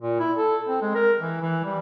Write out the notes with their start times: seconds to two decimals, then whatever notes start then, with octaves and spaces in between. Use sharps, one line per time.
0.01 A#2
0.20 E4
0.37 A4
0.67 C4
0.82 G#3
0.95 A#4
1.19 E3
1.41 E3
1.64 G3